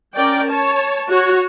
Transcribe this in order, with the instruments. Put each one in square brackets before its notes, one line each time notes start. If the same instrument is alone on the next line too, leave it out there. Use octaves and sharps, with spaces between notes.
[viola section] C#4 A#4 D5 G5
C#5 A5
F#4 C#5